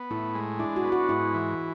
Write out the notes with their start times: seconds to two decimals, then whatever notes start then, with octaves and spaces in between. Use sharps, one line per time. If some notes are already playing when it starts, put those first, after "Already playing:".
Already playing: B3
0.10 A2 E4
0.35 G#3
0.59 D4 E4
0.76 F#4
0.84 B3
0.92 F#4
1.09 G#2 E4
1.34 E3